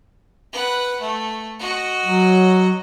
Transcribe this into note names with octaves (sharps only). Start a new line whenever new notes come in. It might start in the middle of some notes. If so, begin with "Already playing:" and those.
B4 F#5
A3
F#4 D#5
F#3